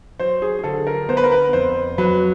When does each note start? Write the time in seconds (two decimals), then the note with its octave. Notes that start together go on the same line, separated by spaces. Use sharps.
0.19 F#3 C5
0.42 G#4
0.59 G#4
0.64 D3 A4
0.87 A#4
1.09 B3 C5
1.17 B4
1.24 A#4
1.32 B4
1.53 F2 C5
1.98 F#3 B4